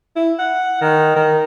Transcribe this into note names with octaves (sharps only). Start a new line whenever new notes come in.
E4
F#5
D#3
D#3